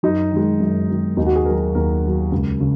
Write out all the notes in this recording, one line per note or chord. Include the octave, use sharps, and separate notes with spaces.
F#2 D#4
D#3 G#3
F#2
D#3 G#3
D#2 D#4
F#4
G#4
D#3 F#3 A#4
D#2 A#4
D#3 F#3
C#2
C#3